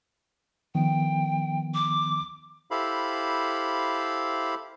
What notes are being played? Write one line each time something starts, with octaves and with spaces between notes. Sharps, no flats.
D#3 F3 B3 G5
D6
E4 G4 A4 C5 F5 B5